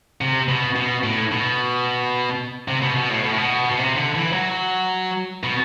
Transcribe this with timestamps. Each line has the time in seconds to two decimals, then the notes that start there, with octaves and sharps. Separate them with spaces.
0.21 C3
0.49 B2
0.76 B2
1.04 A2
1.32 B2
2.68 C3
2.82 B2
2.97 B2
3.10 A2
3.24 B2
3.31 A2
3.38 B2
3.72 B2
3.78 C3
3.97 D3
4.15 E3
4.33 F#3
5.43 B2